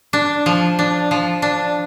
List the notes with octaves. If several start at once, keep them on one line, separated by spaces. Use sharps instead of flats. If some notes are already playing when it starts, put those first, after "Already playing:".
D4
F3
D4
F3
D4